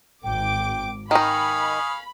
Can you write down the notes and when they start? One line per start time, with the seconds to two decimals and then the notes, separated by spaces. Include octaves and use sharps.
0.23 G#1 G5 D6
1.11 D#3 D#4 F5 G#5 B5 C#6 D#6